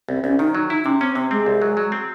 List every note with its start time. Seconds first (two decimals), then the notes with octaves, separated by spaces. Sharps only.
0.09 C2 C4
0.24 C2 C#4
0.39 D#3 D#4
0.55 F#3
0.70 D#4 E4
0.85 C3 C#4
1.01 C4 C#4
1.15 C3 C4
1.31 G#3 C4
1.46 C2
1.62 F#3
1.77 F#3
1.92 C4